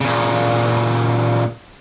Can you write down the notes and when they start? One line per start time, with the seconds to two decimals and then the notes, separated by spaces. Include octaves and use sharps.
0.01 A#2 C#3